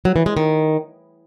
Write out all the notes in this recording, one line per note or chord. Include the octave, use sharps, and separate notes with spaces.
F#3
E3
G#3
D#3